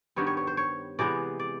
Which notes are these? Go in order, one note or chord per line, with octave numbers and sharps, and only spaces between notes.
G2 D#3 G3 B3 C#5
C#5
C#5
C5
C#5
C3 E3 G#3 B3 D5
D5